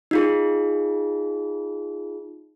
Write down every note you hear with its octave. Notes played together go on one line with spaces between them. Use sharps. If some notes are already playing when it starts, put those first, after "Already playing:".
D#4 F4 G#4